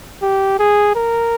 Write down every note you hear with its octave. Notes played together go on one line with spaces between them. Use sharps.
G4
G#4
A#4